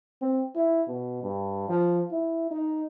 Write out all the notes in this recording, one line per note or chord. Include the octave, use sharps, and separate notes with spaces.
C4
E4
B2
G2
F3
E4
D#4